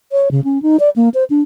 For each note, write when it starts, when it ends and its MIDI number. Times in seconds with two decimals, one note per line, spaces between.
0.12 0.28 73
0.31 0.41 49
0.44 0.61 61
0.62 0.77 63
0.80 0.90 74
0.96 1.09 58
1.14 1.24 72
1.30 1.42 62